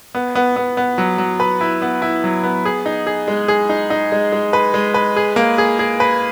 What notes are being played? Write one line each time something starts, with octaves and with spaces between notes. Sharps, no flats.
B3
B3
B3
B3
F#3
F#3
B4
E4
B3
E4
F#3
B3
G#4
D#4
G#4
G#3
G#4
D#4
D#4
G#3
G#3
B4
G#3
B4
G#4
A#3
G#4
G#4
B4